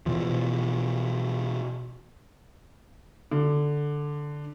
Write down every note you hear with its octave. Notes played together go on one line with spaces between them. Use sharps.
B2 E3 F3
D3